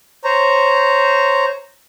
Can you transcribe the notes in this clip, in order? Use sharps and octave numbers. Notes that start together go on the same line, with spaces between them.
C5 C#5 A#5